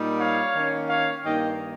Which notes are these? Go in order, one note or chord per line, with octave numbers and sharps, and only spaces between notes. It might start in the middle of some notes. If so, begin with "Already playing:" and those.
Already playing: A#2 G3 A#3 D#4
C#5 F5
D#3 A#3 C#4
C#5 F5
G2 D#3 A#3 D#4 D#5 G5